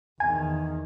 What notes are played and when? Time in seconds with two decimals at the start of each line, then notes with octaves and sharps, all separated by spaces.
0.20 E2 D#3 G#5